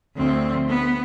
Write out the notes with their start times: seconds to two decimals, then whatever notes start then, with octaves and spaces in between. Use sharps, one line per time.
0.16 D2 C4
0.69 B3